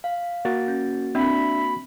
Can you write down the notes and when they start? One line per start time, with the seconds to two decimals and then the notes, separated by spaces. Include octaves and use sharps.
0.04 F5
0.45 A#3 F#4 A6
0.68 C#4
1.15 C4 D4 E5 B5